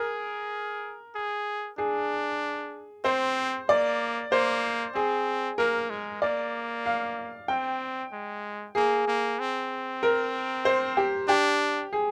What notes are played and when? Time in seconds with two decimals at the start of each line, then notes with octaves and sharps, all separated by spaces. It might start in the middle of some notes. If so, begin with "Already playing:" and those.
Already playing: G#4 A#4
1.15 G#4
1.78 D4 G#4
3.04 C4 C5
3.69 A#3 D5
4.32 A#3 C5
4.95 C4 G#4
5.58 A#3 A#4
5.90 G#3
6.22 A#3 D5
6.86 F5
7.48 C4 G5
8.12 G#3
8.75 A#3 G#4
9.08 A#3
9.39 C4
10.03 A#4
10.65 C5
10.97 G4
11.28 D4 G4
11.93 G#4